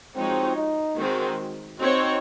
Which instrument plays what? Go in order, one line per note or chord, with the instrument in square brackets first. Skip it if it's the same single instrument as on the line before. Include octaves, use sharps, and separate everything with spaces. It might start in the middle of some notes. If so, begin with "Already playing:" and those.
[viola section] F3 G#3 D#4 F#4 C#5 [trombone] C4
[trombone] D#4
[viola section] D#3 G#3 C4 F#4
[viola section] C4 F#4 C#5 [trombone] D#4